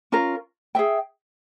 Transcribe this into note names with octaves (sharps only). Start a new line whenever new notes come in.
C#4 F4 A#4
G#4 E5 G5